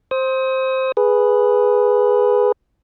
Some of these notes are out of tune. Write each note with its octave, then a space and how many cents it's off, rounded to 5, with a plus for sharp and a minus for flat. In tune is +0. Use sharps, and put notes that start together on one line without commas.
C5 +5 D#6 +35
G#4 +0 B4 +0